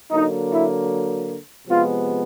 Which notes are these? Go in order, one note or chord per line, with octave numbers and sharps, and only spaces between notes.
D3 F#3 A#3 D#4
E4
C3 F3 G#3 B3 F4